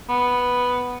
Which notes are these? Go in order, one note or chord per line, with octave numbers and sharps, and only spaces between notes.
B3